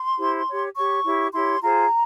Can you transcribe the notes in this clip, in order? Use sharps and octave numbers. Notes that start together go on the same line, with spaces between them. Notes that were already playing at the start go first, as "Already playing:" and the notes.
Already playing: C6
E4 G4 C5
G4 C#5
G4 C#5 C#6
E4 G4 C#5
E4 G4 C#5 C6
F4 G#4 C5 A#5